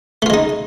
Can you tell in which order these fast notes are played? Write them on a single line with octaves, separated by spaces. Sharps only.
A3 F4 G#3 D#4